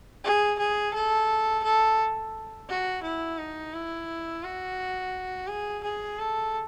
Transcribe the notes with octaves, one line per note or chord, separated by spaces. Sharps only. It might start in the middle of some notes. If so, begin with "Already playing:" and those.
G#4
G#4
A4
A4
F#4
E4
D#4
E4
F#4
G#4
G#4
A4